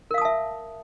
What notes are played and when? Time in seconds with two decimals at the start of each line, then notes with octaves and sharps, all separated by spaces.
0.11 A#4
0.14 F5
0.18 D#6
0.21 A5
0.25 E5